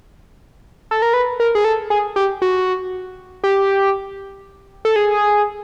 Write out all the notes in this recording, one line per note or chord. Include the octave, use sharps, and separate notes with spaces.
A4
A#4
B4
A#4
G#4
A4
G#4
G4
F#4
G4
A4
G#4